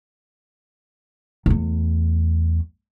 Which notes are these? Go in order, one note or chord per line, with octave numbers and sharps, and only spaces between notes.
E2 A3